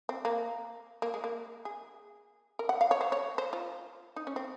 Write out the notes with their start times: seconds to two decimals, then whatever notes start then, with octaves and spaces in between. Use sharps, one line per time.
0.09 C4
0.25 A#3
1.02 A#3
1.14 G#3
1.24 A#3
1.65 G#4
2.59 A#4
2.69 F#5
2.81 F5
2.91 C#5
3.01 C5
3.12 C#5
3.38 C5
3.53 F4
4.16 D#4
4.27 C#4
4.36 C4